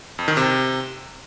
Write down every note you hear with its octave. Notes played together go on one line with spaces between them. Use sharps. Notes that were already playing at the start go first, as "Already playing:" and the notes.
F2
D#3
C3